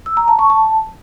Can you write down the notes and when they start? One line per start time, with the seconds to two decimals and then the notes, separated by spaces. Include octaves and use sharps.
0.06 E6
0.17 A#5
0.28 A5
0.39 C#6
0.50 A5